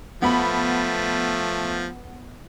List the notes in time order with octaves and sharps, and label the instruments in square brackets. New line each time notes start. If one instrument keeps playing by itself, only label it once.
[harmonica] F3 A3 [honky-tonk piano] B3 B5